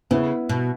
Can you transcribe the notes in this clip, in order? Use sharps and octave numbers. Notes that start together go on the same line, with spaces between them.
C#3 B3 E4
B2